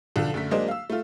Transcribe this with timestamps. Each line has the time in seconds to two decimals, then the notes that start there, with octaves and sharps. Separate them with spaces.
0.16 B1 D3 F3
0.34 F#2 D3 A3 B6
0.51 F#3 G#3 A#3 D4 C5 D#5
0.68 F5 E6
0.90 A3 F4